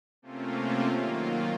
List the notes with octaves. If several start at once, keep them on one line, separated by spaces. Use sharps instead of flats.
C3 A3 A#3 C4 C#4 F4
D#3 F#3 A#3 F4